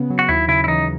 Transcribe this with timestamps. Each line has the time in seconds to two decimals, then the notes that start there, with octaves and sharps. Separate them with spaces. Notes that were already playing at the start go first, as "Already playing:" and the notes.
Already playing: C#3 B3
0.10 F#3
0.19 F#4
0.28 D#2 E4
0.48 C#3 E4
0.64 E4
0.68 E3 D#4